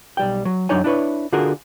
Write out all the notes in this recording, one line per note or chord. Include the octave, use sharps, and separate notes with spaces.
B1 G3 G5
F#3
F#2 F#3 D4 D#4 C#5 G#5
D4 E4 B4 C#5
D3 F4 F#4 G#4 A#4